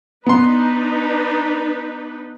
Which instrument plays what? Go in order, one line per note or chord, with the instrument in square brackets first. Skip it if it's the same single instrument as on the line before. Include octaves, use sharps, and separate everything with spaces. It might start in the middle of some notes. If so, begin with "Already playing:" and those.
[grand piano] B3 C6 [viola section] D4 D#4 B4 [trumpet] A#5